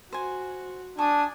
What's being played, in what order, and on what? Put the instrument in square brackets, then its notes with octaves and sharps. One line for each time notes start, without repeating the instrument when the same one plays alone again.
[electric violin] F#4 [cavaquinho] C5 G#5
[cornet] D4 [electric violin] G#5 D#6 [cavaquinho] A5 C#6